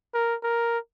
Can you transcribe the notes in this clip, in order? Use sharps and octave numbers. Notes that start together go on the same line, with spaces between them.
A#4
A#4